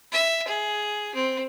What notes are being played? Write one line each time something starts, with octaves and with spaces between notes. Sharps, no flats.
E5
G#4
C4